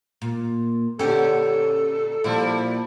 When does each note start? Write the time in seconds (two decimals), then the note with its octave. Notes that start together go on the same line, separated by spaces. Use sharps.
0.22 A#2
0.99 A#2 D3 C#4 G4 A4
2.24 A#2 F3 G3 E4